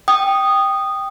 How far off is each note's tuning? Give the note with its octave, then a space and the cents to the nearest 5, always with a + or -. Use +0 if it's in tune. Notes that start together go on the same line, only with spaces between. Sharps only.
G5 +0 D#6 -15